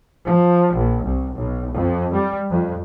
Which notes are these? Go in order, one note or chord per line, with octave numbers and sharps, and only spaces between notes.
F3
A#1
C2
B1
F2
G3
F2